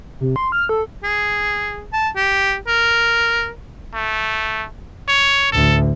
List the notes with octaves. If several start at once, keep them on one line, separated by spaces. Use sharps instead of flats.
C3
C6
F6
A4
G#4
A5
G4
A#4
A3
C#5
A1 D2 A4